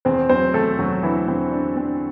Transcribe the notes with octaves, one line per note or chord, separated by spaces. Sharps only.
E2 C4 C5
F#3 C4 C5
E2 A3 A4
E2 F#3 F#4
D3 E3 E4
E2 C4
D3 D4
D3 C4